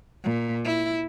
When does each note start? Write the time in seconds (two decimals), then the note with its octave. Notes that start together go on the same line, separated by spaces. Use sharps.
0.24 A#2
0.65 E4